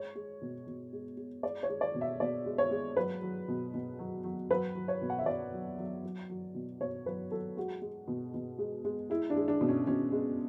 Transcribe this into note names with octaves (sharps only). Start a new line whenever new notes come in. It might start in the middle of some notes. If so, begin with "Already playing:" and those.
Already playing: G#3 C#5
G#3
B2
B2
G#3
G#3
G#3 D5
C#5
G#3
D5
B2
E5
B2 D5
G#3
C#5
G#3
F#3 B4
F#3
B2
B2
F#3
F#3
F#3 B4
F#3
C#5
B2
F#5
E5
B2 D5
F#3
F#3
F#3
F#3
B2
B2 C#5
F#3 B4
F#3 A4
G#3 F#4
G#3
B2
B2
G#3
G#3
G#3 E4
D4
G#3
D4
B2
C#4
B2 C#4
G#3